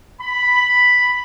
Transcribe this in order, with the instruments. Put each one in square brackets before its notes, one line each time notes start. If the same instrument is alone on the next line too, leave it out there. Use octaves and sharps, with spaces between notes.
[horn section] B5